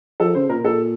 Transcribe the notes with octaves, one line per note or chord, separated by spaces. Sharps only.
F3 A4
C#3 C5
A#2 A#4
A#2 A4